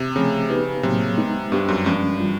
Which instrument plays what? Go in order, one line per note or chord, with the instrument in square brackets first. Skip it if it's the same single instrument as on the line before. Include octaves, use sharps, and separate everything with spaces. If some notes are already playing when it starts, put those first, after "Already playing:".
Already playing: [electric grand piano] C3
[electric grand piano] C#3 [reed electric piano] F3 A3 C4
[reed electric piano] B3 D#4 G4 B4
[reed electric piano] A2 F#3 A#3 [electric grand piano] C3
[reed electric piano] G#3 B3 D#4
[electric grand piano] G2 [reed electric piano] B3 D4 G4
[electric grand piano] F#2
[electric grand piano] G2 [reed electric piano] F3 G#3 C#4
[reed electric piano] E3 G3 C4 F4